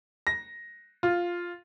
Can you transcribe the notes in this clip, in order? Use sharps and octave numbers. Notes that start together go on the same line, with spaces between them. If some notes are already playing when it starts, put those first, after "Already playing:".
A#6
F4